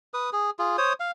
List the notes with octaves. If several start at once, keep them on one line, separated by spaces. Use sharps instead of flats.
B4 D#6
G#4
F4 G#4
C5 C#5 D#6
F5